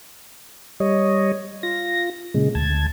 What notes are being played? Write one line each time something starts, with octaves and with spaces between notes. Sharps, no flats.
G3 C#5 D#5
F4 A#6
A#2 C#3 G#3
D2 A5 G#6